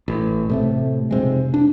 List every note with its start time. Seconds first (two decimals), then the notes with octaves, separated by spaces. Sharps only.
0.08 A1
0.50 A2 C3 A3
1.11 F1 C3 G#3
1.54 D4